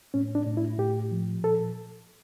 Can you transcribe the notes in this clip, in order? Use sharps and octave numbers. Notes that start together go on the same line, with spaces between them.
A2 C#4
D4
A2
E4
A2 G4
F3
A#2 A4